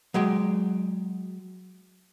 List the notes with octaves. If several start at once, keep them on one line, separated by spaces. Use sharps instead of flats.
F#3 G#3 G5